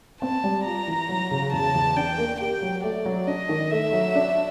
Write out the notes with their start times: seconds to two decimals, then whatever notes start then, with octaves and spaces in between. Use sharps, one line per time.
0.22 C4 A5
0.44 G3
0.65 F4 A#5
0.87 E3
1.09 F#3
1.31 C#3
1.53 E2 A5
1.75 E2
1.96 D4 G5
2.18 A#3
2.40 G4 G5
2.62 F#3
2.84 A3 D5
3.05 F#3
3.27 D4 D#5
3.49 D#3
3.71 A3 E5
3.93 F#3
4.15 D4